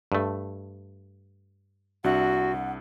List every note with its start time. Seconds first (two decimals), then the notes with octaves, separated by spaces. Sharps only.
0.12 G2 A3
2.04 C2 D4 F#4 E5 F#5